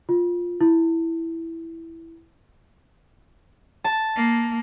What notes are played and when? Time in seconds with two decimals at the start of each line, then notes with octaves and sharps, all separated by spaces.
0.09 F4
0.61 E4
3.84 A5
4.16 A#3